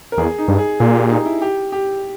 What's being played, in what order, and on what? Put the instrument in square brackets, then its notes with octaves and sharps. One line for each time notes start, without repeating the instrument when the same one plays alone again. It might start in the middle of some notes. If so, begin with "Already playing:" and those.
[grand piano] A#4
[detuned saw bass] E2 [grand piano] G#4
[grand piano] D#4
[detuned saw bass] G2
[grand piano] G#4
[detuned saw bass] A#2 [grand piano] G#4
[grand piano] G4
D#4
E4
G4
G4